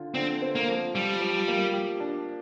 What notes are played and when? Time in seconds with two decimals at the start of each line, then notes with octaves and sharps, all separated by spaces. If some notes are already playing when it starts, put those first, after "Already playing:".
Already playing: D3 F4
0.14 D3 C4
0.42 C4
0.55 A#3
0.68 F3
0.94 F3 G3
1.21 F3
1.48 A#3
1.74 G4
2.00 D4